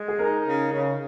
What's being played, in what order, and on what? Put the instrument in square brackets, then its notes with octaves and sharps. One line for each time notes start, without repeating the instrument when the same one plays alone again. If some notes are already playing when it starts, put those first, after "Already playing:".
Already playing: [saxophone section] G#3
[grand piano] G#4
[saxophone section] D#4 [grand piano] A#4
[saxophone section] C#3
C#3